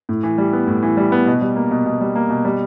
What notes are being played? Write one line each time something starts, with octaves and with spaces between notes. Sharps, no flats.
A2
E3
G3
B3
A2
E3
G3
B3
B2
G3
A#3
B2
B2
G3
A#3
B2
G3